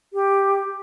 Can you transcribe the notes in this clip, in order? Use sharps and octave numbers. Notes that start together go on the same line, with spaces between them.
G4